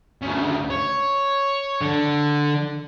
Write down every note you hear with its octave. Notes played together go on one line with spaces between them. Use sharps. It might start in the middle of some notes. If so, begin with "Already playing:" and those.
D2 C#3
C#5
D3